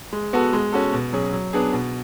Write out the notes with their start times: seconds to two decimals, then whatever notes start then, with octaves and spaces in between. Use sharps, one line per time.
0.13 G#3
0.33 B3 F#4 A4
0.53 G#3
0.73 C#4 F#4 A4
0.93 B2
1.13 F#3 C#4 G#4
1.33 F#3
1.53 B3 D4 G#4
1.73 B2